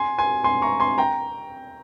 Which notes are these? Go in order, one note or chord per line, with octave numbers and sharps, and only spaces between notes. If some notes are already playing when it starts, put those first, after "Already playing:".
Already playing: G#5 C6
G#5 C6
G#5 C6
A#5 C#6
G#5 C6
G5 A#5